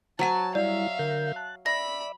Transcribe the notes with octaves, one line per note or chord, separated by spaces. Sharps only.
F#3 C5 F#5 G#5 A5
G3 E4 D5 E5 F5
D3 A#4 G6
A5 F#6
D5 E5 B5 A#6